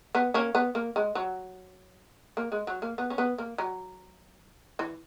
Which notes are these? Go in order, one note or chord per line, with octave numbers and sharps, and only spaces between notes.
B3
A#3 C#4
B3
A#3
G#3
F#3
A#3
G#3
F#3
A#3
B3
C#4
B3
A#3
F#3
E3